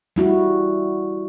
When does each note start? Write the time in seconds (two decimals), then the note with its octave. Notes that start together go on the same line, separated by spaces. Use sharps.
0.16 G3 E4 F#4